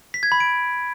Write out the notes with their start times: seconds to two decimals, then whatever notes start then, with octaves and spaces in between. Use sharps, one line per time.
0.14 B6
0.23 G#6
0.32 B5
0.40 D7